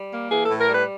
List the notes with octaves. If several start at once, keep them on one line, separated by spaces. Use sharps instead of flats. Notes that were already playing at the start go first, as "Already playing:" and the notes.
Already playing: G3
A#3
E3 G#4
A2 A4
A#4
G3 B4